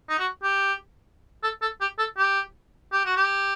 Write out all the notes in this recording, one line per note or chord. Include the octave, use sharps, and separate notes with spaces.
D#4
F#4
G4
A4
A4
G4
A4
G4
G4
F#4
G4